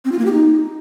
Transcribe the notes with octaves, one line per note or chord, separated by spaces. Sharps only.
C4
F4
A#3
G4
D#4